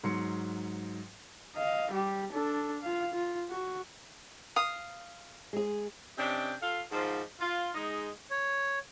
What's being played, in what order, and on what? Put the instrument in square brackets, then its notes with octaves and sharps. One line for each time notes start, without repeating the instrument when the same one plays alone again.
[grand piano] G#2 F#3 C6 C#7
[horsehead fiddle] D#5 F5
G3 G4
D4 A4
F4 F5
F4
F#4
[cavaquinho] F5 D#6
[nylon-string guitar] G#3 G#4
[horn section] C3 C#4 D4 D#5 G5
F4 A4 F5
G#2 D#3 F3
F4
G#3 D#4
[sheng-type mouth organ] C#5